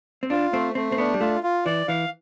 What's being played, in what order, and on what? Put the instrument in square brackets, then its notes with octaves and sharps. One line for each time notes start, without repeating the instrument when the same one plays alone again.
[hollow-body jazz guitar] C4
[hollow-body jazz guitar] D4 [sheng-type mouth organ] F4
[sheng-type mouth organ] A3 [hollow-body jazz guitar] C4
[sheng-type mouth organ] A3 [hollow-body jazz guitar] C4
[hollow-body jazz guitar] C4
[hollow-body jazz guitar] B3 [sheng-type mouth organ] D4
[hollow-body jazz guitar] G3
[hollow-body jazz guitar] A3 [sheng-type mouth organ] F4
[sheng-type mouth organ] F4
[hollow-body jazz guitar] E3 [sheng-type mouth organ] D5
[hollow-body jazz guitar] E3 [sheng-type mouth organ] F5